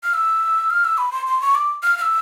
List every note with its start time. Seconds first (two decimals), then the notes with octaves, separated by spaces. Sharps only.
0.04 F6
0.14 E6
0.70 F6
0.84 E6
0.98 B5
1.12 C6
1.27 C6
1.41 C#6
1.55 D6
1.83 F6
1.98 F6
2.02 E6